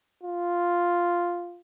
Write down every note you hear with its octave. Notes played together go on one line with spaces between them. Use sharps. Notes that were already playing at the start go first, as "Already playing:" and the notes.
F4